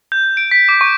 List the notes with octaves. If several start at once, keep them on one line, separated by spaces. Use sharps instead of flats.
G6
D7
B6
D6
C#6